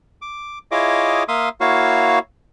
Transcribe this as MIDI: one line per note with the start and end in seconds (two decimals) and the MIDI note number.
0.22 0.59 86
0.71 1.23 64
0.71 1.23 65
0.71 1.23 68
0.71 1.23 73
0.71 1.23 75
0.71 1.23 86
1.28 1.49 58
1.28 1.49 76
1.28 1.49 77
1.28 1.49 84
1.28 1.49 87
1.61 2.19 58
1.61 2.19 64
1.61 2.19 66
1.61 2.19 73
1.61 2.19 77